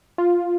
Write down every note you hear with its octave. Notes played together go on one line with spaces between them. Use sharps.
F4